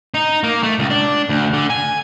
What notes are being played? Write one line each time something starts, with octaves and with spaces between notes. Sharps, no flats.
D#4
A#3
A3
C#2
D4
D2
D3
G#5